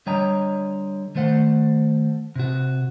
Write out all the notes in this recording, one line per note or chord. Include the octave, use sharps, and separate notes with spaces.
D3 G3 C#5 D#5 G5 A#5
D#3 A3 C5 F#5
C3 F#4